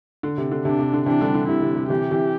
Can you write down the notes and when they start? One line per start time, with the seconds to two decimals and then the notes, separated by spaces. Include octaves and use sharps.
0.23 D3
0.38 C3
0.51 D3
0.65 C3 D4
0.79 C3
0.93 D3
1.06 C3 E3 D4
1.21 D3 G3
1.34 D3
1.48 C3 E4
1.63 C3
1.76 C3
1.89 C3 E3 G4
2.11 C3 E3